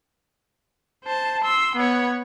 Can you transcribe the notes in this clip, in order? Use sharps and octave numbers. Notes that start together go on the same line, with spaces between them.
C5 A5
C6 E6
B3 C#5